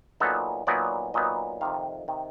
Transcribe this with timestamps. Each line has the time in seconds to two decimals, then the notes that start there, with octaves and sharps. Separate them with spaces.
0.20 A#2 F#3 B3 D#4 A4
0.67 A#2 F#3 B3 D#4 D5
1.14 A#2 F#3 B3 D#4 D#5
1.61 F2 C3 D#3 F5
2.08 C3 D#3